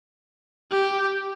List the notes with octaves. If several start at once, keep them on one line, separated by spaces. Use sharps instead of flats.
G4